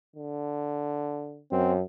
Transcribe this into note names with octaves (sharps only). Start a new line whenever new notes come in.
D3
F#2 C4